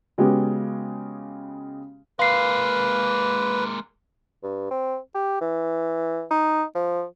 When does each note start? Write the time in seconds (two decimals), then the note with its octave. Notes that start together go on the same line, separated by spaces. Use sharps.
0.18 C#3 G#3 B3 C#4 F#4 G4
2.19 G#3 A#3 B4 F5 C7
4.43 G2
4.71 C4
5.15 G4
5.41 E3
6.31 D#4
6.75 F3